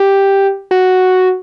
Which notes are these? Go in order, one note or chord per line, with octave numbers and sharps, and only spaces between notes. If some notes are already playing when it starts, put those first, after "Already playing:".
Already playing: G4
F#4